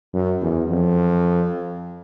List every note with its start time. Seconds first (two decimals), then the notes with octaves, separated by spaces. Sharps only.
0.14 F#2
0.42 E2
0.70 F2